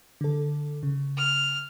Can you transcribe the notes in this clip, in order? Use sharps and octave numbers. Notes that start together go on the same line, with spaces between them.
D3 A4
C#3
F6